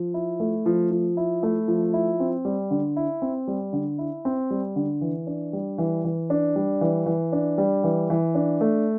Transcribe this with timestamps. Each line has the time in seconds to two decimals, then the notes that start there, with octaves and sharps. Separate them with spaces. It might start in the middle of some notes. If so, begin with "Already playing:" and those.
Already playing: F3
0.14 E4
0.40 A3
0.66 F3
0.91 F3
1.17 E4
1.43 A3
1.68 F3
1.94 E4
2.20 C4
2.45 G3
2.71 D3
2.96 E4
3.22 C4
3.48 G3
3.73 D3
3.98 E4
4.25 C4
4.51 G3
4.76 D3
5.01 E3
5.27 D4
5.53 G3
5.78 E3
6.04 E3
6.30 D4
6.56 G3
6.81 E3
7.06 E3
7.32 D4
7.58 G3
7.84 E3
8.10 E3
8.35 D4
8.61 A3